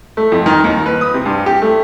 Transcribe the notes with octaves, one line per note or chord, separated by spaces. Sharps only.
A3
F2
D#3
D#2
B4
D#6
C3
G2
G4
A3